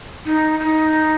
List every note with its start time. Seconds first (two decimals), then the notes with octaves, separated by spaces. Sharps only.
0.26 D#4
0.60 D#4